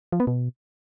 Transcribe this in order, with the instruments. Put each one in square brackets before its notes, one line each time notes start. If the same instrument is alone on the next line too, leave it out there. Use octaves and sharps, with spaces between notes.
[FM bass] F3
B3
B2